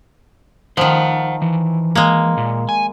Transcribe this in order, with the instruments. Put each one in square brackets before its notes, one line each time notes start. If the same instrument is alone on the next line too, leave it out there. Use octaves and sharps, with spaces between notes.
[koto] D#3 F3 [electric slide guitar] C5 F#5
[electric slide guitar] E3
[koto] G#3 A#3
[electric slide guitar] A#2
G#5